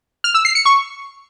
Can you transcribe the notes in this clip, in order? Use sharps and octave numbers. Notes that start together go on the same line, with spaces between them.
F6
E6
C7
C#7
C#6